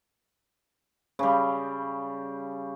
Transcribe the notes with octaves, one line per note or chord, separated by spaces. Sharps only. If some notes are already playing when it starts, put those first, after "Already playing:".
C#3 G3